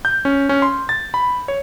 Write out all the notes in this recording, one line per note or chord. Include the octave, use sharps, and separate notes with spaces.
G6
C#4
C#4
C6
A6
B5
C#5